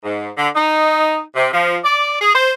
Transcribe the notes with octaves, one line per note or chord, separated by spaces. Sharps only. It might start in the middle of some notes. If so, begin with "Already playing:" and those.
G#2
D3
D#4
C3
F3
D5
G#4
C5